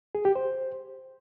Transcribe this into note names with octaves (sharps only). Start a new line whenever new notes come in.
G#4
G4
C5